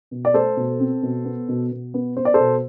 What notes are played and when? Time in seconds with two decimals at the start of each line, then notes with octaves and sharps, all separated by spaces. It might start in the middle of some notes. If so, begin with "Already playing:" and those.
0.11 B2
0.25 D5
0.34 A3 A4 C5
0.57 B2
0.80 C4
1.03 B2
1.25 B3
1.49 B2
1.72 B2
1.94 B3
2.17 B3 C5
2.25 D5
2.34 A4 C5
2.40 B2